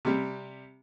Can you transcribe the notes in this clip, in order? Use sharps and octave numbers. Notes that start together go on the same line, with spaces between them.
C3 G3